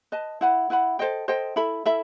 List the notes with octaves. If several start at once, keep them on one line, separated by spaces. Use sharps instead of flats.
B4 D#5 A5
E4 B4 F#5 B5
E4 B4 F#5 B5
A4 C5 D#5 G5
A4 C5 D#5 G5
E4 A4 E5 B5
E4 A4 E5 B5